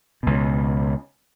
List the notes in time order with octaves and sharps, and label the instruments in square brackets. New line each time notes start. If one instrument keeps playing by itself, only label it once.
[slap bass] C#2 B2